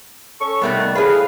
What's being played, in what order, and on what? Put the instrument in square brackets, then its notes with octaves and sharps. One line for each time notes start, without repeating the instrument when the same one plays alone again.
[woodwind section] C#4 A4 C#6
[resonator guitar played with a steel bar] C3 A3 B3 [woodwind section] D#3 G3
[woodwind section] A2 F5 [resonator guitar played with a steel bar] G#4 B4